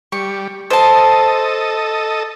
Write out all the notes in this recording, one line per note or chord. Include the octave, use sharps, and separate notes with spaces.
G3 C#6
A4 C5 D#5 A5